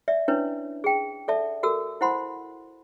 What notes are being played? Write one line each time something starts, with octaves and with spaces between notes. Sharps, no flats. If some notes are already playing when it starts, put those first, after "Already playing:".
D5 E5
C#4 D4 E4 B4 C#5
G#4 G5
A4 D5 E5 A5
F#4 A4 A#4 E6
E4 C5 F#5 B5 C6